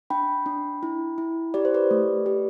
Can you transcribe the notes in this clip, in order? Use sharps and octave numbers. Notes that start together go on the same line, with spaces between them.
D4 G5 B5
D4
E4
E4
G4 D5
C5
B4 D5
A3
G4